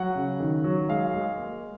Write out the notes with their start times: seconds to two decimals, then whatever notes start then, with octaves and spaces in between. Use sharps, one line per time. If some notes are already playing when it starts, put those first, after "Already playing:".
Already playing: F#3 F#5
0.15 C#3
0.40 D#3
0.64 F#3
0.89 G#3 F5
1.14 G#3
1.38 A#3